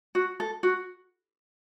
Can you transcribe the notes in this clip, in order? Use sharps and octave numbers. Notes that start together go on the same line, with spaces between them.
F#4
A4
F#4